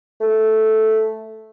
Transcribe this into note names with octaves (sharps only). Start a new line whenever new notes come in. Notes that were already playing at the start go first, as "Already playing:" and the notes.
A3